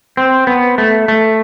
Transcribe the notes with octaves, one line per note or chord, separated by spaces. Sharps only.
C4
B3
A3
A3